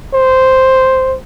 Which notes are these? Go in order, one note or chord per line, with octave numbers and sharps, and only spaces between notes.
C5